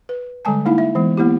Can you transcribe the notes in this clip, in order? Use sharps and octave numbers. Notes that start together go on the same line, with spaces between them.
B4
D3 G3 G#3 G#5 A5
A#3 D#4 E4 F5
E5
E3 G#3 B3
A#3 B3 E4 G4